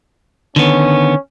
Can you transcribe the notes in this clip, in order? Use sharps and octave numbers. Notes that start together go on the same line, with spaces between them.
D3 D#3 B3 C#4